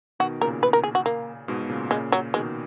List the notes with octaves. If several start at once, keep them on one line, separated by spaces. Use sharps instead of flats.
B2 D#3 F#4
A#2 C#3 A#4
B4
A#4
G#4
F#4
A#3
G#2 B2
B2
A#2 C#3
A#2 C#3 G#3
F#3
B2 D#3 G#3